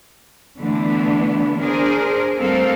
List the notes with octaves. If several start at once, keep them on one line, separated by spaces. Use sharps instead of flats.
D3 E3 A3 B3 D4
D4 G#4 A#4 C5
G3 A3 C4 A4 A#4 F5